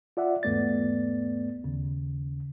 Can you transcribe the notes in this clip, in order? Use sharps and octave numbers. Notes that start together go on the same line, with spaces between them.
F4 D5 E5 F#5
E2 G#2 A3 B3 D5 A6
D#2 C#3